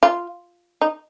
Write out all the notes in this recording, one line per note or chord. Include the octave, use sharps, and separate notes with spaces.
F4
D#4